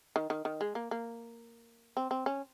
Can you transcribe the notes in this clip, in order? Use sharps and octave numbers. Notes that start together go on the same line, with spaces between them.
D#3
D#3
D#3
G#3
A#3
A#3
C4
C4
C#4